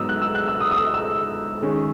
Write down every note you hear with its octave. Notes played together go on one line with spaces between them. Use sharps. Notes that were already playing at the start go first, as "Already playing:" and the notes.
Already playing: G#2 F#3 B3 D#4 D#6 E6
F#6
E6
F#6
E6
D#6
D#6
E6
E6
D#3 G#3 C#4